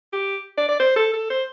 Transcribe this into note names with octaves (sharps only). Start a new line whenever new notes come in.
G4
D5
D5
C5
A4
A4
C5